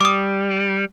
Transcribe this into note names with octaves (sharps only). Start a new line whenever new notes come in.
G3 D6 D#6